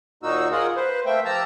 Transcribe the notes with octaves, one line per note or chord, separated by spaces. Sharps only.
D#2 A#2 A#3 D#4 F#4 E6
F4 G#4 A#4 F#5
B4 C5
A3 A#3 C4 E5 G5
F3 G4 A5 A#5 E6